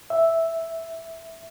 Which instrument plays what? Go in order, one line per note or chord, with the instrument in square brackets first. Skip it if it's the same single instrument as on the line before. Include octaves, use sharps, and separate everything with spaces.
[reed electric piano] E5